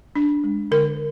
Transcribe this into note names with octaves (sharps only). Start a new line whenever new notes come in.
D4
G#3
D3 A#4